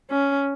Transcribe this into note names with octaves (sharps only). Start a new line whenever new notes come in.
C#4